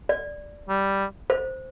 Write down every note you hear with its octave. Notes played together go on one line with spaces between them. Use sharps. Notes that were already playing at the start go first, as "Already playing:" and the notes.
D5
G3
C5